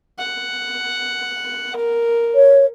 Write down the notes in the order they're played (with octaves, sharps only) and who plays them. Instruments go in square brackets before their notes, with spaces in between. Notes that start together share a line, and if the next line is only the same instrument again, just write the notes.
[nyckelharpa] F#5
A#4
[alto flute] C#5